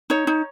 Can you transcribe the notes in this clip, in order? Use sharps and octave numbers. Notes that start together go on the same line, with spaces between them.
D#4 C#5
D#4